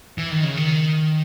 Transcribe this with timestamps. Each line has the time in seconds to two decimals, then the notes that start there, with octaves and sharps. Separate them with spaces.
0.18 E3
0.31 D#3
0.44 C#3
0.57 D#3